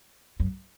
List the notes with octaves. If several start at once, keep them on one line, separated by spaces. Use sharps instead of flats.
F#2